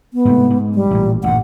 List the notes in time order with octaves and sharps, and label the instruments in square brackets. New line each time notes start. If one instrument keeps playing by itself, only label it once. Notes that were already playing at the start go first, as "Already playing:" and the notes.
[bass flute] B3
[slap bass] G#2 C3 A3
G#2
[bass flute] G3
[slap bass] A1 A#2
[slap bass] A1 G2 A#2 [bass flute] F#5